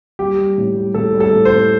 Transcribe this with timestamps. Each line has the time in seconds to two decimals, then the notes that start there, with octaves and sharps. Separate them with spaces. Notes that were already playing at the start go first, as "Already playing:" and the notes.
0.19 G3 G4
0.38 G3
0.58 A2
0.76 G3
0.94 A2 A4
1.14 G3
1.20 A4
1.33 A2
1.45 C5
1.52 A2